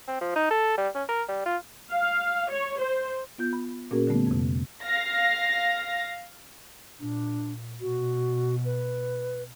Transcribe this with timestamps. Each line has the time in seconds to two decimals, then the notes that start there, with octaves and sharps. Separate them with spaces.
0.07 C4
0.21 F3
0.35 D#4
0.50 A4
0.78 G3
0.95 C#4
1.08 A#4
1.28 G3
1.46 F4
1.92 F5
2.50 C#5
2.80 C5
3.38 B3 F4 G6
3.53 B5
3.91 A#2 A#3 C#4 F#4 G#4 A#4
4.07 D3 G3 A3 B3
4.27 F2 C3
4.84 F5 A#6
7.00 A#2 D4
7.81 B2 F#4
8.65 B4